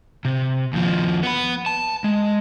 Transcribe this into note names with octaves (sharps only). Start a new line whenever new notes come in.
C3
D#2 F3
B3 B4
A5
G#3